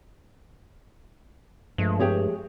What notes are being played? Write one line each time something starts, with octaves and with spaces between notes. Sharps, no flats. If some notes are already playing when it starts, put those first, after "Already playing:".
G2 F3 G#3 A3
G4 G#4 C#5